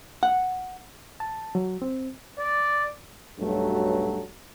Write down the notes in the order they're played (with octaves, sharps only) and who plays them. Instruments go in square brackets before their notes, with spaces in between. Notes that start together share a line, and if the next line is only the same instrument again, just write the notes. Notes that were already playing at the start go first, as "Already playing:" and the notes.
[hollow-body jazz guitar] F#5
[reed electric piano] A5
F#3
C4
[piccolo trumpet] D5
[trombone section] B1 G2 F#3 A3